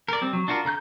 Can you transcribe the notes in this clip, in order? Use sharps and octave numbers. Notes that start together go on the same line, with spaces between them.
A#4 D5
G3 C4
F#3
D4 F4 F#4 A#4
D3 A#5 F#6 G6